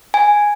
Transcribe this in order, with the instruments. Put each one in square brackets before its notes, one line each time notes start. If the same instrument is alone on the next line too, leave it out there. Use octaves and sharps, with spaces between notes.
[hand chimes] G#5